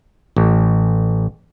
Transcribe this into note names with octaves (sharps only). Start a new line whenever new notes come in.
A1